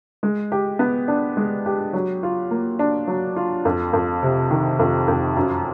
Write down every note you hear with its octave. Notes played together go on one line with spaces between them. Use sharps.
G#3
G4
B3
D4
G#3
G4
F#3
F4
A#3
D4
F#3
F4
F2
F2
C3
D#3
F2
F2
F#2